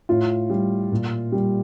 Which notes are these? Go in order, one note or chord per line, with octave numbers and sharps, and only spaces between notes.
A2 F4
G3
A#2
G3